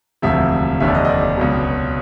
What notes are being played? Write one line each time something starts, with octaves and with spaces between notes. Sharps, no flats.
E1 D2 C3 F3 E5
F1 D#2 D3 E5
D5
D#5
D#5
D5
C#2 B2 F#3